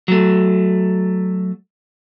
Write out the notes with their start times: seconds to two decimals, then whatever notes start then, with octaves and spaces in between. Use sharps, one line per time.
0.08 F#3 A3